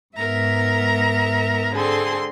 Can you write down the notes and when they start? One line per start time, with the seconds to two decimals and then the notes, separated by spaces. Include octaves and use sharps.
0.16 G#2 B3 A#4 E5 A#5
1.74 D3 C4 G#4 A4 C6